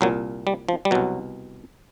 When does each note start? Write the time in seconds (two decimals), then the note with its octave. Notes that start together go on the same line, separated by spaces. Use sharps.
0.01 C2 A#2 F#3
0.47 G3
0.69 F3
0.85 G3
0.91 C2 B2 F#3